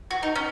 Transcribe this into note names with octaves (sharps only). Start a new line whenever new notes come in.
F#4
D#4
C#4